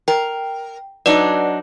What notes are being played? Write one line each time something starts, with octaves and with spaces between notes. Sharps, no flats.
A#4 G5
F#3 D4 D#4 B4 D5